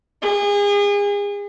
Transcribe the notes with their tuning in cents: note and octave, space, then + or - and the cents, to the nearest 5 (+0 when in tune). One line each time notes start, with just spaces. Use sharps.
G#4 -35